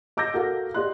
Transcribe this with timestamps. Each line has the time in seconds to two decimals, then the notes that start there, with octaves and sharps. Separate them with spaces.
0.17 D#5 D6 E6 G6 A#6
0.34 F#4 A4 A#4 F5
0.74 G4 D5 D#5 C6 F#6